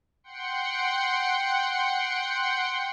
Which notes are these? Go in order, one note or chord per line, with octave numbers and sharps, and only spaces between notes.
F#5 G5 C6 C#7